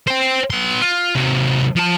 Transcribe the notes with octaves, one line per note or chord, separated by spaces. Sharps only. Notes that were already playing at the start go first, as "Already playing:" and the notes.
C5 G5
B3 C6
F4
C3 F#3
F3 A5